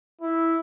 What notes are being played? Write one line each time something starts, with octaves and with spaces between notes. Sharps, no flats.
E4